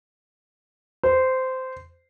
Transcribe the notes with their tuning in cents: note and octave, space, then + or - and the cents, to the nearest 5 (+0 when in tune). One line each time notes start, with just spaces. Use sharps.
C5 -15